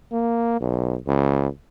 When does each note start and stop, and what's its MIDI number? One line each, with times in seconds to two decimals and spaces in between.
0.12 0.55 58
0.60 0.96 35
1.07 1.47 37